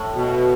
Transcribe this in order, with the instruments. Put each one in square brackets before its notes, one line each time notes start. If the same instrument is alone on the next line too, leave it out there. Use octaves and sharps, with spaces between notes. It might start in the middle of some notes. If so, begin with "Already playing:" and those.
Already playing: [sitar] A2
[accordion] B2